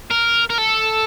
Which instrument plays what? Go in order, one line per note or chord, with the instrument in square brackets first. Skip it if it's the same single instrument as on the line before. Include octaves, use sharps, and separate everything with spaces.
[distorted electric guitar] A#4
A#4
A4